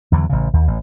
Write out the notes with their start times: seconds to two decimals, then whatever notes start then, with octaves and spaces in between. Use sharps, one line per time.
0.12 E2 D3 F3 F#3
0.30 A1 C#3
0.53 D#2
0.68 A1